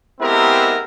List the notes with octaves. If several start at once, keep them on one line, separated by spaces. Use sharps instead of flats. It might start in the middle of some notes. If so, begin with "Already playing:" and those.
G#3 B3 C4 E4 G4 A#4